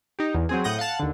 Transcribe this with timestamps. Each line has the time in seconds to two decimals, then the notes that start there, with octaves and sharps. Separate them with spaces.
0.19 D#4 G4
0.34 E2
0.49 F#3 C4 G#4
0.64 A2 F#5 D#6 G6 A#6
0.79 F5 F#5 A5 F#6
0.99 D#2 D3